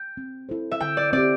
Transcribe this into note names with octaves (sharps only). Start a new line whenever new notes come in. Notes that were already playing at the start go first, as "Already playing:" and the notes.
Already playing: G5
C4
E4 A4 C5
E5
D3 G5
D5
C4 G4 D5